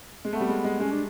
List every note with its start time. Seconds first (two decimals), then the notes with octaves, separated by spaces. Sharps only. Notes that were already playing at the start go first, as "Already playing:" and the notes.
0.25 G#3
0.33 A3 B3
0.41 G3
0.49 G#3
0.64 G#3
0.80 G#3 C#4
0.92 D4